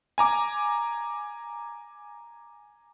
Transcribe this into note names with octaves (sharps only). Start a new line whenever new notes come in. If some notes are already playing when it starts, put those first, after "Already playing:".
G#5 A#5 D6